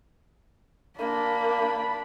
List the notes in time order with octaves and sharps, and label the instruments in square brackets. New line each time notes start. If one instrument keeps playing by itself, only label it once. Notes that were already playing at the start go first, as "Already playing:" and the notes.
[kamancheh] A#3 [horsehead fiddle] D4 B5